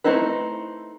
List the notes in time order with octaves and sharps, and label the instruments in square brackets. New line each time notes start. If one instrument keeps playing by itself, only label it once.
[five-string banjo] A3 C4 D#4 E4 B4